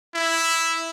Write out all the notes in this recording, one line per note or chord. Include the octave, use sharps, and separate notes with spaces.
E4